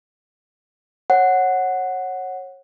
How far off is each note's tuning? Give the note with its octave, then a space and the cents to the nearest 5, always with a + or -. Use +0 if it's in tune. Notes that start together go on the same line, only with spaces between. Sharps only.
C#5 -25 F#5 +0